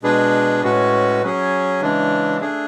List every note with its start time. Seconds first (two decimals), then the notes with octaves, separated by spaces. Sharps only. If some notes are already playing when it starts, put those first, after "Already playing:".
0.03 B2 G#3 D4 G#4 B4
0.62 A2 G#3 C#4 F#4 B4
1.23 F#3 C#4 G#4
1.81 C#3 E3 G#3 D4
2.41 A3 D4 G#4